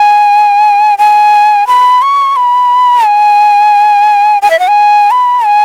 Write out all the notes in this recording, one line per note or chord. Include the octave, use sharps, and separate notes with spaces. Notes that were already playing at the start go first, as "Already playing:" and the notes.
Already playing: G#5
G#5
B5
C#6
B5
G#5
G#5
E5
F#5
G#5
B5
G#5